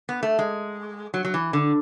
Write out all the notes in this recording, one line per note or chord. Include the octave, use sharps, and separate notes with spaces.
B3
A3
G#3
F#3
F#3
E3
D3